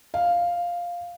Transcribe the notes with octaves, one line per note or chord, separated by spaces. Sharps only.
F5